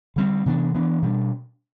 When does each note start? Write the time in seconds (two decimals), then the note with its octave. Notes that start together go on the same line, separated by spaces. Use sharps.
0.16 D3 G3 C4
0.46 C3 E3 B3 D4
0.74 E3 B3 D4
1.02 B2 G3 D4